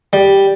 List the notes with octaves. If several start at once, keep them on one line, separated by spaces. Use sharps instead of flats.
G3